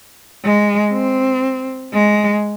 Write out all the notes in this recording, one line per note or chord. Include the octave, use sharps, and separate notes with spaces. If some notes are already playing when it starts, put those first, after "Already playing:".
G#3
C4
G#3